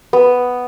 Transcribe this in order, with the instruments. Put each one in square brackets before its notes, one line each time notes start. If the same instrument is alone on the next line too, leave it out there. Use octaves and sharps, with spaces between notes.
[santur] B3